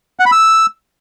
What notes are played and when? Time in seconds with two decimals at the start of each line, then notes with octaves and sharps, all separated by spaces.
0.20 F#5
0.26 B5
0.32 E6